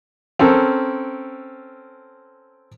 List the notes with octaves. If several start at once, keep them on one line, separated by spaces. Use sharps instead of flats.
C4 C#4 A4 A#4